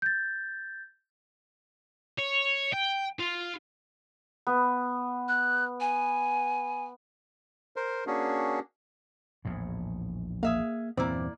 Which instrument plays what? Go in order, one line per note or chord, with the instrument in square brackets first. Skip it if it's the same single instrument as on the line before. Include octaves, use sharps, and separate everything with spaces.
[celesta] G6 A6
[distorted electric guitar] C#5
G5
F4
[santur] B3
[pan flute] F#6
G#5
[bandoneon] A#4 C5
A#3 C#4 D4 F#4 G#4
[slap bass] A#1 E2 A2
[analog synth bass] A#3 [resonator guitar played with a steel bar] G#4 E5 F5
[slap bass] E2 G2 A#2 [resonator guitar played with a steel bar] A#3 E4 D5 [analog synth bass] C4